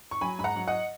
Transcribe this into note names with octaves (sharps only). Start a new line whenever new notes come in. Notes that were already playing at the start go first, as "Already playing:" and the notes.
C#6
F#3 G#5 B5
G#2 B5
F#5 A#5
F#3
D#5 F#5